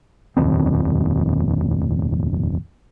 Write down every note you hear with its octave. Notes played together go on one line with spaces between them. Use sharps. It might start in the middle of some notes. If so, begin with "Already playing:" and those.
F1 A#1 D#2 C4